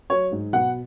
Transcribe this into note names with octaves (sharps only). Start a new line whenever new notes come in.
F#3 C#5
G#2
B2 F#5